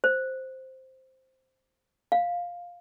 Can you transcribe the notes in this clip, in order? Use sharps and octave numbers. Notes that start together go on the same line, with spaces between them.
C5
F5